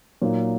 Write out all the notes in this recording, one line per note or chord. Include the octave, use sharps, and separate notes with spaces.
A#2 F#3 A#3 D#4